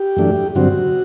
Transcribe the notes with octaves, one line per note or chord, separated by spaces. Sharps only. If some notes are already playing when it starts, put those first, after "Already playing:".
Already playing: G4
F#2 E3 A3 D4
G2 D3 F#3 C4 F#4